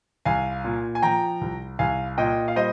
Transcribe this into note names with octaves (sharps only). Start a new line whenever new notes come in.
C2 F5 G#5
A#2
G#5
F3 G5 A#5
C2
C2 F5 G#5
A#2 D#5 G5
F5
G3 C5 D#5